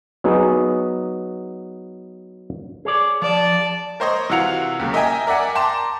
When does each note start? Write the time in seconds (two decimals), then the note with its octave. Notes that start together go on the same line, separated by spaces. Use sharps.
0.24 F#3 B3 D#4 G#4 B4
2.85 G#4 C#5 D5
3.22 F3 D5 A5
4.00 A#4 C5 C#5 D#5
4.30 C3 E3 F4 F#4 C#7 F7
4.80 D#2 C#3 F#3
4.93 A#4 D#5 E5 G5 G#5 A#5
5.27 A#4 D5 E5 F#5 G#5
5.55 G5 A5 A#5 C6 D6 E7